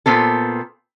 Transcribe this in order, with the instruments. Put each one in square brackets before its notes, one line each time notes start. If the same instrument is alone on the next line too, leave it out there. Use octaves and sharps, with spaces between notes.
[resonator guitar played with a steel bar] A#2 B3 C4 A4